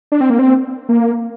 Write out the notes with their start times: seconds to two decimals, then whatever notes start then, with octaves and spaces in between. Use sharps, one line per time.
0.12 D4
0.21 C4
0.30 A#3
0.39 C4
0.89 A#3